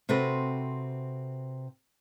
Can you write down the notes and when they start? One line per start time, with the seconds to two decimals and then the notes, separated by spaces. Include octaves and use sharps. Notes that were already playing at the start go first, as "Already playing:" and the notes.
0.09 C3 C4 F#4 A4 B4